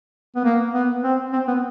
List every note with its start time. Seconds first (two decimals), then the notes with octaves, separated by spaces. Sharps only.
0.36 B3
0.45 A#3
0.74 B3
1.04 C4
1.33 C4
1.48 B3